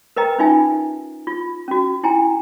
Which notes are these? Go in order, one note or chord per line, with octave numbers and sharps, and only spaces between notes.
A#4 B4 D#5 G5 A#5
C#4 D#4 F4 E5 G#5
F4
C#4 F#4
E4 G5 G#5 A#5